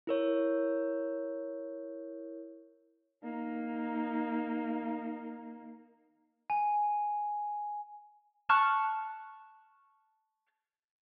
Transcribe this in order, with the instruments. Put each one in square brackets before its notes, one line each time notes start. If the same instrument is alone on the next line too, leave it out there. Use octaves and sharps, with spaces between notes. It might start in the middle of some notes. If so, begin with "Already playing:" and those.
[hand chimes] E4 A#4 C#5
[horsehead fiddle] A#3 D#4
[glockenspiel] G#5
[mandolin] A5 C#6 F6 F#6